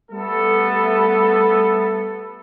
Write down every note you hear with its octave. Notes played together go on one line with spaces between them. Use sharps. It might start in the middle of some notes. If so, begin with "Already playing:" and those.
G3 A3 B3 A4